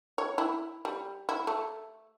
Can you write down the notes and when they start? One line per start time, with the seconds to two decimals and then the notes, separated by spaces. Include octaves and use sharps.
0.18 C#5
0.38 E4
0.85 G3
1.29 E4
1.47 A3